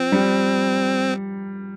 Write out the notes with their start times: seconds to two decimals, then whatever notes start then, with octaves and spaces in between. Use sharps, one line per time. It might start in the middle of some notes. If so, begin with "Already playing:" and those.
Already playing: F3 C4
0.12 G3